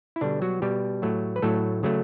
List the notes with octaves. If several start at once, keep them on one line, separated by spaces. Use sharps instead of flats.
E4
B2 D3 G3 D4
F#3 F#4
B2 G3 G4
A2 F#3 A3
B4
A2 F#3 A3 A4
C#3 F#3 A3